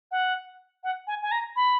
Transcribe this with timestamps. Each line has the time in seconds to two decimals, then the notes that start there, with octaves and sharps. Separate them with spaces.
0.11 F#5
0.84 F#5
1.07 G#5
1.22 G#5
1.31 A#5
1.56 B5